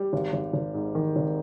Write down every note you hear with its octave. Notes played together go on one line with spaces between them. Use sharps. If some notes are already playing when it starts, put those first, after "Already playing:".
Already playing: G3
G#1
G#1
G#1
G#2
D#3
G#1